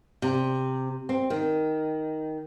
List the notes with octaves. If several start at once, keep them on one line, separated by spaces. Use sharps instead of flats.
C3
C4
D#3